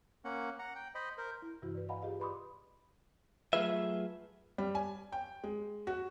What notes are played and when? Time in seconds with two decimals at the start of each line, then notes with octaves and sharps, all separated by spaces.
0.25 A#3 C#4 F#5
0.59 F#5 A#5
0.75 G5
0.95 C5 D#5 B5
1.18 A#4 C5
1.42 E4
1.62 G2 C3 E3 E4 F#4
1.75 B4 D5
1.89 D#5 F5 F#5 G#5 A#5 B5
2.02 F4 G4 G#4 D#5 F5
2.20 B4 D5 B5 C6 D6 D#6
3.53 F#3 A3 F4 G#4 B4 E5
4.58 G3
4.75 G#5
5.12 G5
5.44 G#3
5.87 F#4